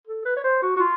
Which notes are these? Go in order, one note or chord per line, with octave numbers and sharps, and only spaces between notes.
A4
B4
C#5
C5
F#4
F#4
F4